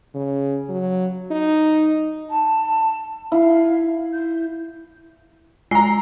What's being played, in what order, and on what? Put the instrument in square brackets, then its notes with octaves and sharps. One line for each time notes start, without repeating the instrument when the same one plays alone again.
[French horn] C#3
F#3
D#4
[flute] A5
[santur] E4 [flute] F5
[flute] G6
[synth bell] G#3 F4 G#5 [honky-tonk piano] A#5 C7